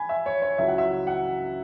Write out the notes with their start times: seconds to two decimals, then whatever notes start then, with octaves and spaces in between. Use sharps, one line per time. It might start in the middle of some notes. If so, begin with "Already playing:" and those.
Already playing: G#5 B5
0.09 E5
0.26 C#5
0.42 C#5
0.58 C#2 C#3 F#3 E4 E5
0.68 F#5
0.78 E5
1.07 F#5